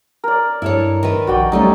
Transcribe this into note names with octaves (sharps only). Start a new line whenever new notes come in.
A#4 D5
G2 E4 A4 C#5
D#3 B4
A#1 F#4 D5 G5
C2 G3 A3 C#4 D#4